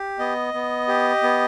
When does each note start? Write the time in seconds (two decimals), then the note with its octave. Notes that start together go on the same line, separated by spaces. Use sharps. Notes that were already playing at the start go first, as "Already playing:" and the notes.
Already playing: G4
0.19 B3 D#5
0.54 B3
0.88 G4
1.23 B3